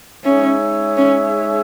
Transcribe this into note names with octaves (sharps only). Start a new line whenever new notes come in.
G#3 C#4 D#4 G#4 C#5 E5
C#4